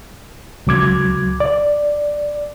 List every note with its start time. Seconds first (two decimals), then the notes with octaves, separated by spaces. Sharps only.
0.67 C#2 F#3 D6 G#6
1.40 D5